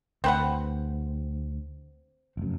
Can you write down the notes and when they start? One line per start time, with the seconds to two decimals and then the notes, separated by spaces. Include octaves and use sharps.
0.24 D2 C4 B4 F#5
2.37 F1 F#2